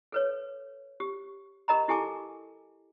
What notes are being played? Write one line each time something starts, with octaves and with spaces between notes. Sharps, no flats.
A4 B4 C#5
G4
G4 A#4 D#5 A#5 B5
E4 G4 A4 G#5 A5 D6